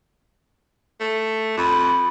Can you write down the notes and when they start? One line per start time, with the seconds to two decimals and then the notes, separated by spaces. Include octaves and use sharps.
1.00 A3
1.57 F2 B5